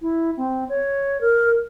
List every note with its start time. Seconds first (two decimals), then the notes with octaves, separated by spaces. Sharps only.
0.02 E4
0.37 C4
0.69 C#5
1.21 A#4